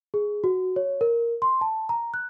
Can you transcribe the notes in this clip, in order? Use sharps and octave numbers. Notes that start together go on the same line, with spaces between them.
G#4
F#4
C#5
A#4
C6
A5
A#5
F#6